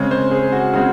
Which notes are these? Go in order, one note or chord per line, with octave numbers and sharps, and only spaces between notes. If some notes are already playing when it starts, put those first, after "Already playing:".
Already playing: C#3 G#3 C4 C#5
C5
G#4
F#4
C#3 G#3 C4 F#4